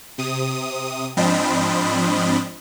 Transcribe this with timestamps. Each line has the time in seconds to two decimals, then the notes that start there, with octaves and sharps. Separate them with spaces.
0.18 C3 D#6
1.17 G#2 F3 C4 D4 D#5 B5